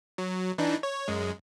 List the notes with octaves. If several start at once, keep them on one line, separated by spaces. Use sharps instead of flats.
F#3
E3 D4 D#4
C#5
F#2 G#3